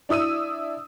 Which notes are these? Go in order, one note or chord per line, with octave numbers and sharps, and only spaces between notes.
D4 E4 D#6 E6 D#7